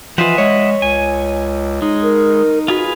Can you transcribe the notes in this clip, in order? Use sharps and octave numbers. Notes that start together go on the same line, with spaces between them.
E3 F3 F4 D#5 E5 F#5
G#3 C#5
C#2 G#5
G#3 D#4
A#4
F4 F#4 G#4 B4